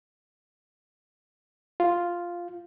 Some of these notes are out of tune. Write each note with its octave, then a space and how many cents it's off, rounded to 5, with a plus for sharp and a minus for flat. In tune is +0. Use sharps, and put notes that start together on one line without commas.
F4 +0